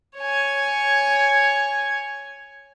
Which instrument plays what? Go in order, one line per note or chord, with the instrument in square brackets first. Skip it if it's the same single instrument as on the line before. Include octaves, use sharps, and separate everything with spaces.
[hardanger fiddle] C#5 G#5